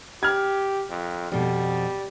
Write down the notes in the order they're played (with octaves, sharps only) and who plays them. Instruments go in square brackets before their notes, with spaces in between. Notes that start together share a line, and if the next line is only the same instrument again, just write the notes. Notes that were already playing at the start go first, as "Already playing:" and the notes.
[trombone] G4 [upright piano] F6 G#6
[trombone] F2
[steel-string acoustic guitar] F2 B2 [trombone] G3